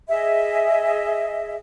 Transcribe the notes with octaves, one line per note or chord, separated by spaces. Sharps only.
G#4 D#5 E5